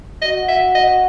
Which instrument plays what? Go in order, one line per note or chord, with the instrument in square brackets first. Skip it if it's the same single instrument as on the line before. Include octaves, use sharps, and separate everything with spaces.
[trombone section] F#4 [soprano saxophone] D#5
[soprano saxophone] E5
D#5